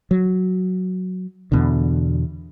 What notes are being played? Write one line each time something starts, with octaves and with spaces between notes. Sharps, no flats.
F#3
E2 B2 D3